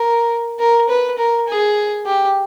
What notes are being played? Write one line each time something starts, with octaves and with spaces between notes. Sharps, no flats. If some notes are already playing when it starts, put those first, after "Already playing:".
Already playing: A#4
A#4
B4
A#4
G#4
G4